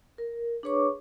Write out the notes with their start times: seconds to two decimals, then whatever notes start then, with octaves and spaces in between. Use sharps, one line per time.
0.18 A#4
0.63 D4 G#4 B4 C#5 C#6 D6